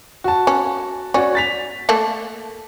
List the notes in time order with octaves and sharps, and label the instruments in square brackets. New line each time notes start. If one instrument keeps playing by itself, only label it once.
[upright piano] F#4 A5
[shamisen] C#4
[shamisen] C#4 [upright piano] F#4 C#5 D5
[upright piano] A6 B6 F7
[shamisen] A3 A#3 A4